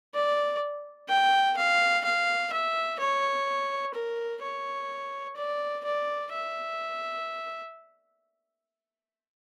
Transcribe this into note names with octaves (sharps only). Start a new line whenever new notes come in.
D5
G5
F5
F5
E5
C#5
A#4
C#5
D5
D5
E5